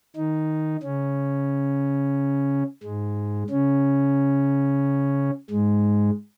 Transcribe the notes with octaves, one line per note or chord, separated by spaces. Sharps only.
D#3 D#4
C#3 C#4
G#2 G#3
C#3 C#4
G#2 G#3